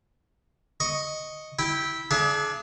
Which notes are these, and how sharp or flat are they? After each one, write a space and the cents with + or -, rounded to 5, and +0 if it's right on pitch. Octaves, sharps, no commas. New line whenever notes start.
D#5 +0 C#6 +0
E4 -15 G5 +0
D4 +0 G#4 +35 E5 +40